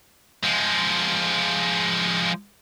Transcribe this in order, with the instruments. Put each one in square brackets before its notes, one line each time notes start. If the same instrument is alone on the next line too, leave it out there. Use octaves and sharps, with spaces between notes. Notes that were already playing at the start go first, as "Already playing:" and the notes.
[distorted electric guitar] F3 G#3